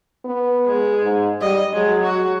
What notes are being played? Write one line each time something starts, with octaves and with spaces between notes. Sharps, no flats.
B3
G#3
G#2
G3 D#5
F#3 G#3
F#4